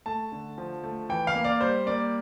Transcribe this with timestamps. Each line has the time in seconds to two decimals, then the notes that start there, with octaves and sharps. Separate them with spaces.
0.06 A3 A5
0.32 D3
0.58 F3
0.83 A3
1.09 E3 G5
1.27 F5
1.35 A#3
1.44 D5
1.61 G3 C5
1.86 A#3 D5